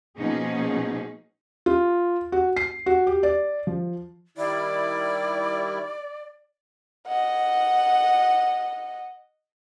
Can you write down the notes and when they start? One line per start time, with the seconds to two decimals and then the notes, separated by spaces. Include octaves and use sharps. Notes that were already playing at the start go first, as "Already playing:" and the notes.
0.17 B2 F3 A#3 C#4 D#4 G#4
1.66 F4
2.32 F#4
2.57 C7
2.86 F#4
3.07 G4
3.23 D5
3.67 F3
4.38 D#3 G3 E4 D5
7.07 D#5 F#5